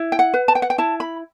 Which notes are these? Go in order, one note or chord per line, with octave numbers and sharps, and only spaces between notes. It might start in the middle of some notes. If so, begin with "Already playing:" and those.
Already playing: E4
G5
F#5
B4
A5
G5
F#5
G5
E4 A5
B5